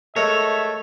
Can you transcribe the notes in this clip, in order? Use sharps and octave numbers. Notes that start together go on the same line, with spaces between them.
G#3 A3 A#4 C#5 E5